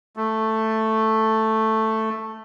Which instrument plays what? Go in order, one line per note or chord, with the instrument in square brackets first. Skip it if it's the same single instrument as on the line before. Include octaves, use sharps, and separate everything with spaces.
[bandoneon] A3